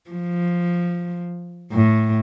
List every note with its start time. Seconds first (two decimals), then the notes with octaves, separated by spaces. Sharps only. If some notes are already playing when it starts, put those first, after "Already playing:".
0.10 F3
1.73 A2